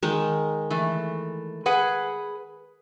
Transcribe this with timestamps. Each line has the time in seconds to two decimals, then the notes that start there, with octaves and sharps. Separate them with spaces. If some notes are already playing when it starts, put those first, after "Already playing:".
0.03 D#3 G#3
0.70 E3 A3
1.66 G#4 B4 F#5